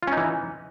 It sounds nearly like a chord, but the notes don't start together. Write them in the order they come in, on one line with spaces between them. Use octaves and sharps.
F4 C#4 D#4 E3